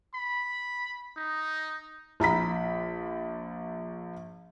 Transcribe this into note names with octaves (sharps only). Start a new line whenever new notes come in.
B5
D#4
A#1 A#5 B5 B6